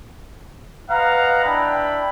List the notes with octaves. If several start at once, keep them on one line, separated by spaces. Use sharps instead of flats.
B4 D#5 F5 F#5 A#5
D4 E4 G5 B5